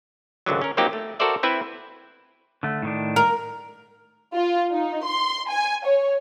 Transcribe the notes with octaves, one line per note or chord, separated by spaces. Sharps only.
G#1 C#2 D3 F#3
C#4 A#4
F3 F#3 A#3 C4 D#4 G4
A3
F#4 A4 A#4 C5 D5 E5
C4 E4 B4 E5
D3 A3
A2 D#3 D4
A#4
F4
D#4
C6
G#5
C#5